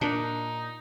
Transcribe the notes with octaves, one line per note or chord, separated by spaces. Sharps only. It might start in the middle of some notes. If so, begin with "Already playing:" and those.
A#2 D4 D#4